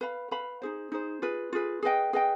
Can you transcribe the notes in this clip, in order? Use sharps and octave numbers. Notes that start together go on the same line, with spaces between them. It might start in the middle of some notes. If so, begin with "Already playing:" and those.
B4 F5 B5
B4 F5 B5
D#4 G#4 C5
D#4 G#4 C5
F4 G#4 B4
F4 G#4 B4
G#4 B4 D#5 G5
G#4 B4 D#5 G5